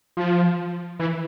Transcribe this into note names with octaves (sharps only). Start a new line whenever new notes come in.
F3
E3